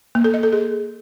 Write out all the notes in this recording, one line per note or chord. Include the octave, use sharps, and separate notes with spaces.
A#3
A4
D#5
A4
G#4